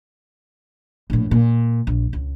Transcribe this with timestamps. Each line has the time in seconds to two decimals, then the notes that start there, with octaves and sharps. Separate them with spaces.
1.10 A#1 A2
1.31 A#2
1.87 A#1
2.13 C#2